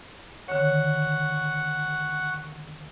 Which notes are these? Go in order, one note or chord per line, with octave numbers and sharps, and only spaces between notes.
D3 D#3 C#5 F#5 C#6